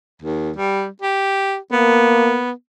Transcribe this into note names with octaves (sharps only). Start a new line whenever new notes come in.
D#2
G3
G4
A#3 B3